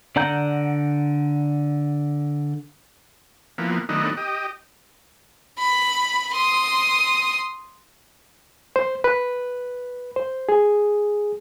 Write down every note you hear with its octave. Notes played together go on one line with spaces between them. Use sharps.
D3 D5 F#5 A#5 G6
E3 F3 A#3 B3
D#3 F#3 A3 B3 D4 D#4
G4 D#5
B5
C6 D#6
C5
B4
C5
G#4